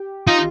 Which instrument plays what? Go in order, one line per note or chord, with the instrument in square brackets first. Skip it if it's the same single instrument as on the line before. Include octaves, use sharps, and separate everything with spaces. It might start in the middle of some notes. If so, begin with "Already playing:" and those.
Already playing: [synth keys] G4
[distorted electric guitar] D#4 [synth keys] F4